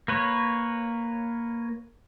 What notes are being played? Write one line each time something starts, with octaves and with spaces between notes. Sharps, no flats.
A#3 B4 C#5